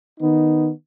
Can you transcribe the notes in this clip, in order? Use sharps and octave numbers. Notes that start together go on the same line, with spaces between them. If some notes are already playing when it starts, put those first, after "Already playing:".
D#3 B3 D#4